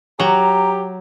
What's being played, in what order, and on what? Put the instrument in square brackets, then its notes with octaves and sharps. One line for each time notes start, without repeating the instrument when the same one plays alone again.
[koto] F#3 [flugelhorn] G4 [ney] A#5